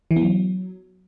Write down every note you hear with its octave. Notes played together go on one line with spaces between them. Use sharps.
E3
B3
F#3